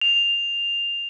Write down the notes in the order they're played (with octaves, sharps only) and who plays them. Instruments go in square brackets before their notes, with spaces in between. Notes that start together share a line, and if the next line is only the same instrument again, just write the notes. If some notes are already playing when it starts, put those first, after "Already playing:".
[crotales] F7